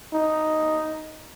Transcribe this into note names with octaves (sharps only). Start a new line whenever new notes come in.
D#4